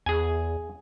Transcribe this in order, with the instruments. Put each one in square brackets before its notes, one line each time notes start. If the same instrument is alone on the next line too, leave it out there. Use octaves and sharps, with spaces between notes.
[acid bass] E2 [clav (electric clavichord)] G#4 G#5